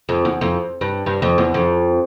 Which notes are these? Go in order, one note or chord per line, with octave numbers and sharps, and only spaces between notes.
F2
E2
F2
G2
G2
F2
E2
F2